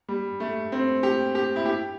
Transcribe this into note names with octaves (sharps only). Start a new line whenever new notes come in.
G3
A3
C4
G4
G4
E4
G4